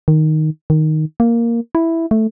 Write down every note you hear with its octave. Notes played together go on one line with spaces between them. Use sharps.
D#3
D#3
A#3
E4
A3